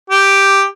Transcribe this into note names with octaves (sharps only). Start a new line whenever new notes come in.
G4